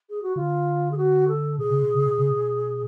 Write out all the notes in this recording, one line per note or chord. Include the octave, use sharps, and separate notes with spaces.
G#4
F#4
D3 F4
G#4
F#4
A4
B2 G#4
C#3
B2
C#3
B2
C#3
B2